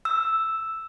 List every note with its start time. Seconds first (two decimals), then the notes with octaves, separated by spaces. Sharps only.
0.05 E6